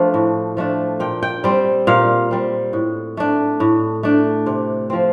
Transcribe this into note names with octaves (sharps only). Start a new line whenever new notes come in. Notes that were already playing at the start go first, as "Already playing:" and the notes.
Already playing: F3 A3 D4
A2
F3 A3 D4
A#2 G5
G5
G3 C4
A#2 F5
G3 C4
A2
A3 D4
A2
A3 D4
C3
F3 C4